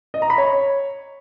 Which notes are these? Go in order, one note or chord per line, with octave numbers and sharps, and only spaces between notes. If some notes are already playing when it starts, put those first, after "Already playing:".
D#5
A#5
B5
C#5